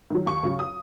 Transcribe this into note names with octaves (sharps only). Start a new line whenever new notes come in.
D#3 F#3
D#2 C#6
C#3 F#3
D#6